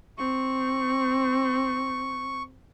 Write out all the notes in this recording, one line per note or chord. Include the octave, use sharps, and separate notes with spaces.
C4 C#6